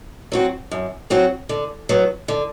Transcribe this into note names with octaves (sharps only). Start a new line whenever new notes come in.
F#3 C4 F#4
F#2
F#3 C4 F#4
D3
F#3 B3
D3